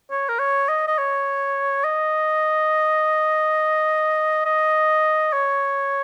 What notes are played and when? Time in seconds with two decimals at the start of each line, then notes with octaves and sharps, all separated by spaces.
0.11 C#5
0.29 A#4
0.39 C#5
0.69 D#5
0.87 D#5
0.98 C#5
1.84 D#5
4.46 D#5
5.33 C#5